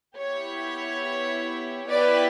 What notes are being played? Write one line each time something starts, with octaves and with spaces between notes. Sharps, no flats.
B3 E4 G4 C#5
B3 E4 G4 B4 D5